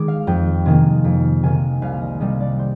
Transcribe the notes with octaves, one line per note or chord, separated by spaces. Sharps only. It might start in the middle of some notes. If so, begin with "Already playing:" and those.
Already playing: D#3 G#3 D6
F5
F2 G5
C3 D#3 A#3 G#5
F2
C3 D#3 A#3 G#5
C2 F5
D#5
C3 G3 A#3 D#5
D5
C5